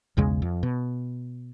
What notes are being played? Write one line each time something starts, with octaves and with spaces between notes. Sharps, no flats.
B1 E2 C#3 G#3
F2
B2